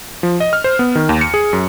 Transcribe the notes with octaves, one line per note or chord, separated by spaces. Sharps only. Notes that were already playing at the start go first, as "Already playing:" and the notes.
F3
D#5
F6
C5
B3
D#3
D#2
C#7
G#4
F#2